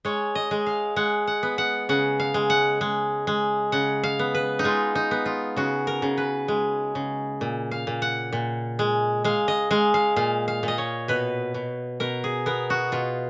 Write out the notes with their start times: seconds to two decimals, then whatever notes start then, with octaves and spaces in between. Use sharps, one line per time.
0.05 G#3 C#5
0.35 D#5
0.51 G#3
0.66 F5
0.96 G#3 F#5
1.27 F#5
1.43 B3
1.58 F#5
1.89 C#3 F#5
2.20 F5
2.34 G#3
2.50 F#5
2.81 G#3
3.27 G#3
3.72 C#3 F#5
4.04 F5
4.19 B3
4.35 B4
4.59 D#4
4.64 G#3 F4
4.95 D#4
5.11 B3
5.26 F4
5.56 C#3 F#4
5.87 A#4
6.02 C#3
6.18 B4
6.48 G#3
6.95 C#3
7.41 A#2
7.71 F5
7.87 A#2
8.02 F#5
8.32 A#2
8.79 G#3
9.24 G#3 F5
9.48 D#5
9.71 G#3 F5
9.94 F5
10.16 A#2 F5
10.48 F5
10.63 A#2
10.68 D#5
10.78 C#5
11.08 B2 B4
11.54 B2
12.00 B2 A#4
12.24 G#4
12.46 B3 A#4
12.70 F#4
12.92 B2 F4